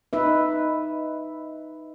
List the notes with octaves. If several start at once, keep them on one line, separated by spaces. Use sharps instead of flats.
D#4 B4 E5